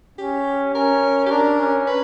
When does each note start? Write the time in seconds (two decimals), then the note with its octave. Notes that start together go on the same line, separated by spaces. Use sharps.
0.18 C#4 G4
0.75 C#4 A#4
1.27 G4
1.31 D4 A#4
1.59 C#4
1.87 B4